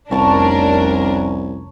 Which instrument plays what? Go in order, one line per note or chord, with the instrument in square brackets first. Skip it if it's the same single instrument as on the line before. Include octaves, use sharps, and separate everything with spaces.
[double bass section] F1 C#4 [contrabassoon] C2 [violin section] D4 A#4 [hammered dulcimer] C#5 A5 A#5